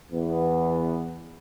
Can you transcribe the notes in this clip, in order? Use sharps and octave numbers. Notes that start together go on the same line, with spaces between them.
E2 B3